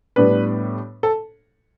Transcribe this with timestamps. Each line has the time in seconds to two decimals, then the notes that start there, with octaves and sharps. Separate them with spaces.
0.16 A2 G3 B3 D4 B4
1.03 A4